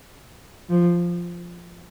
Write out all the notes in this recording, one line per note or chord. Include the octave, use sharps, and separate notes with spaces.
F3